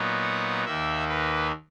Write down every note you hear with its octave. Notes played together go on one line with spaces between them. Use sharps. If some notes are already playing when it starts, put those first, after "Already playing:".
Already playing: A#2 F#3 B3 D#4
F#5
D#2 D#3 A#3 E5
B4